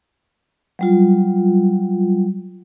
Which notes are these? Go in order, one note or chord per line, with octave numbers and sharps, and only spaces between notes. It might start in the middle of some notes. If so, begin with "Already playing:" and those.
F#3 G3 F4